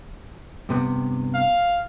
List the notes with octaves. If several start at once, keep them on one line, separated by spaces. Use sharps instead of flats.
G2 C3 B3
F5